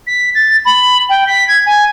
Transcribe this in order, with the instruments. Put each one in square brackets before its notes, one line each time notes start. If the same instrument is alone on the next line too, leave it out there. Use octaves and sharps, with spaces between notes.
[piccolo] B6
A6
B5
G5
B6
G#6
G#5